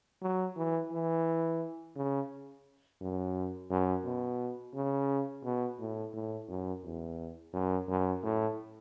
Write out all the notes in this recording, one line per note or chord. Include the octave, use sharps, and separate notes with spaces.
F#3
E3
E3
C#3
F#2
F#2
B2
C#3
B2
A2
A2
F#2
E2
F#2
F#2
A2